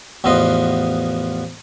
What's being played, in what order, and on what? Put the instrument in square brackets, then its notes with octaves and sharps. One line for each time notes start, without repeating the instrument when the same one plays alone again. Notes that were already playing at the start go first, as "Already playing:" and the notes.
[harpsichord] A1 E2 F3 B3 D#5 C6